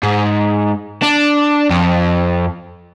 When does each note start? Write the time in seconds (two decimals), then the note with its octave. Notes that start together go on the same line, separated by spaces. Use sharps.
0.03 G#2
1.02 D4
1.70 F2